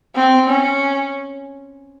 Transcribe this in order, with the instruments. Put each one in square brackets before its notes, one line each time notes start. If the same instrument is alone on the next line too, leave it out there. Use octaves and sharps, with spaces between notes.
[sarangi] C4
C#4